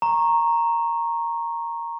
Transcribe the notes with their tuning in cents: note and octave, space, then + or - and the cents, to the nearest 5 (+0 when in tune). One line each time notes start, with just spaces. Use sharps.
A#5 +0 C#6 -20